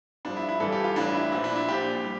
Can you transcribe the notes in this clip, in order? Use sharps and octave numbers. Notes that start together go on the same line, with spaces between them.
G1 G2 F3 D4
E4
E4
G1 G2 E3 G3 A4
G4
F4
A1 G2 E3 D4
E4
A#1 A#2 F3 E4
D4
E4
A#1 A#2 F3 G4
G3